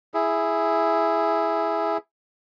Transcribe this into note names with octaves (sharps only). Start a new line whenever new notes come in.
E4 G#4